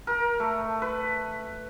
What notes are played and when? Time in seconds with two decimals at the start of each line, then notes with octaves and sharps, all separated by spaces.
0.07 A#4
0.40 A3
0.82 B4